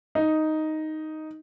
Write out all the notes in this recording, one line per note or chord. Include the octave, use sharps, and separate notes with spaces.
D#4